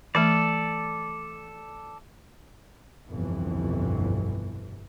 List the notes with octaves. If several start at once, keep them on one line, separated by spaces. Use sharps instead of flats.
E3 A3 A4 D5
G1 C2 F2 B2 E3